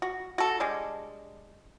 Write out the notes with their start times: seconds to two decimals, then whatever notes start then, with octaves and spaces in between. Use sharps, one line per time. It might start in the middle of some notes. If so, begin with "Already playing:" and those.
0.02 F#4
0.38 F#4 A4
0.60 G3 G#3 D4